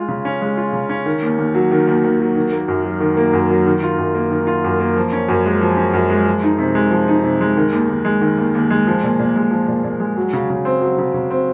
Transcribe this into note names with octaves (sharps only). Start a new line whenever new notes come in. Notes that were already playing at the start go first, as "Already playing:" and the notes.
Already playing: G#3 F4
C#3
C#4
G#3
F4
C#3
C#4
D#3
D#2
D#2
F#3
D#3
D#2
D#2
F#3
D#3
A#3
F#2
F#3
D#3
A#3
F#2
F#3
D#3
F4
F#2
A#3
D#3
F4
F#2
A#3
F3
C#4
F#2
G#3
F3
C#4
F#2
G#3
F3
D#4
C3
G#3
F3
D#4
C3
G#3
D#3
D#2
D#2
G#3
D#3
D#2
D#2
G#3
F3
A#2
A#2
G#3
F3
A#2
A#2
G#3
F#3
C#3
C#3
C4
F#3
C#3
C#3
C4